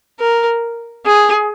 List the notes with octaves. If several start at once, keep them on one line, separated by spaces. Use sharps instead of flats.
A#4
G#4